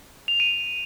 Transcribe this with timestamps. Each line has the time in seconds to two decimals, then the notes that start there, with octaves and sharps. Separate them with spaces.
0.28 F7
0.40 D#7